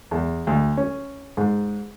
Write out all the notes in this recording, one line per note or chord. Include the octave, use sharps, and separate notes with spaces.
E2
D2
C#4
G#2